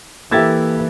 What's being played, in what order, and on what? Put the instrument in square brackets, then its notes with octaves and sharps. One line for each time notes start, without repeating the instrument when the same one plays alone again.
[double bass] E3 [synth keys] A#3 A4 [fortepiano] E4 G4 [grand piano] E6 G#6 A6